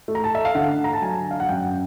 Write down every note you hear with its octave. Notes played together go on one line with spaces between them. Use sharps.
A3
A#5
A5
E5
F5
D3 F#5
A#5
A5
F#3 G#5
F5
F#5
F#2 G5